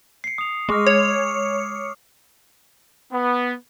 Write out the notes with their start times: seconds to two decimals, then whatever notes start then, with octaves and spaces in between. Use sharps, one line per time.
0.24 C7 C#7
0.38 D#6 F7
0.69 G#3 C#6 D6 F6
0.87 C#5
3.13 B3